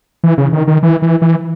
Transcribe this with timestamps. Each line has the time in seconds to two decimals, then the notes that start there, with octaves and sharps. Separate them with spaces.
0.24 E3
0.38 C#3
0.53 D#3
0.67 D#3
0.83 E3
1.02 E3
1.22 E3